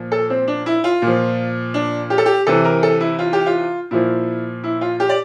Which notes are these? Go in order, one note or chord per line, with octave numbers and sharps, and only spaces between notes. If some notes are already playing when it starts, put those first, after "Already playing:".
Already playing: A#2 F3
A4
C4
D4
E4
F4
A#2 F3
D4
G4
A4
G4
C3 E3 A4
A#4
A4
E4
F4
G4
F4
A#2 F3 E4
E4
F4
G4
D5